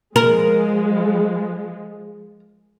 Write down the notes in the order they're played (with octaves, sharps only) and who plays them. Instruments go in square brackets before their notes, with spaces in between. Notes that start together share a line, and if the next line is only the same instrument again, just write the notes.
[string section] F3 G#3 [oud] A#4